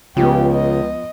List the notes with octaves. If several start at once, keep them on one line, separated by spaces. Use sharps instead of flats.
C#2 C#3 F3 B3 G4
D#5